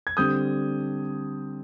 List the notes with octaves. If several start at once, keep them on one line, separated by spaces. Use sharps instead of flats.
G#6
D3 G3 C4 D#6 G6